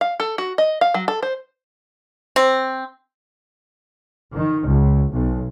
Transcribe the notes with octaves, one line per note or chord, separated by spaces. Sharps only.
F5
A4
F#4
D#5
F5
F#3
A4
C5
C4
D#3
C#2
B1